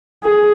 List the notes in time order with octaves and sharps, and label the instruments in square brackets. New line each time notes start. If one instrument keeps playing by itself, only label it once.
[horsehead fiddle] G#4